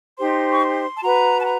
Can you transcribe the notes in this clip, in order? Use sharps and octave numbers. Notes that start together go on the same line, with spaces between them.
D#4 G4 C5 C6
C#6
C6
A5
F#4 B4 A#5
A5
A#5